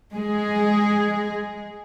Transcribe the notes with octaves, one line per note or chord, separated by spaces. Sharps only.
G#3 G#4